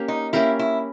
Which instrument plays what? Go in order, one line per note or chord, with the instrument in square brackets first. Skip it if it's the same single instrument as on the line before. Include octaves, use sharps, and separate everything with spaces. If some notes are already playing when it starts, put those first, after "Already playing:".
Already playing: [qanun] A#3 C#4 G4 A#4
[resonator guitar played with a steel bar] D#4
[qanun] A#3 C#4 G4 A#4 [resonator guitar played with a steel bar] E4
[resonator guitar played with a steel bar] E4